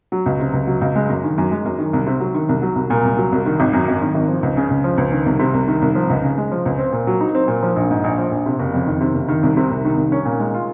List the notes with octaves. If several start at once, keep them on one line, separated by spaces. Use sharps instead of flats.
F#3
C#2
C3
C#2
F#3
C#2
G#3
F#2
D#3
F#2
G#3
F#2
D#3
C2
C3
F#3
D#3
C2
F#3
C2
A#2
C2
F#3
C2
D#3
G#1
F#2
G#1
D#3
G#1
F3
C#2
C#3
C#2
F3
C#2
D#3
C2
C3
C2
D#3
C2
F3
C#2
C#3
G#3
F3
C#2
C4
A#2
F#3
D#4
C4
A#2
F3
A#1
G#2
A#1
F3
A#1
C3
F#1
F2
D#3
C3
F#1
D#3
C2
C3
C2
D#3
C2
C#4
A#2
G#3
F4